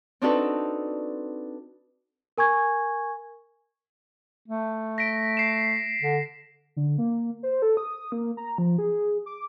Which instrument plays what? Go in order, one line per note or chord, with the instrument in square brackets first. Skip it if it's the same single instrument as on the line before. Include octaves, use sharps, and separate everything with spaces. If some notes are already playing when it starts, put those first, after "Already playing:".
[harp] C4 D4 D#4 F#4 A4 B4
[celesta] A#4 G#5 C#6 G#6
[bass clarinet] A3
[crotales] A#6 B6 D7
C7 E7
[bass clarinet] D3
[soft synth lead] D3
A#3
C5
A4
D#6
A#3
A#5
F3
G#4
D6